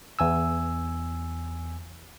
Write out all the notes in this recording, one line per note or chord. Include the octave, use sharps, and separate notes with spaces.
E2 G#5 E6